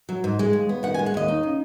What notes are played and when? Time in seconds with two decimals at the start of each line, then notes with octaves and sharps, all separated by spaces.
0.09 F#3
0.24 G#2
0.39 G#3
0.53 D#2
0.69 B3
0.83 D#3 F#5
0.94 G#5
0.99 G#3
1.06 F#5
1.14 D#2 D#5
1.28 D#4
1.43 C#3